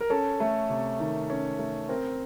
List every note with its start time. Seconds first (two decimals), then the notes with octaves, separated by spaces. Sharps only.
0.01 A#4
0.10 C#4 A4
0.40 A3
0.70 C3
1.00 D#3
1.30 C#4
1.59 A3
1.89 C4 A#4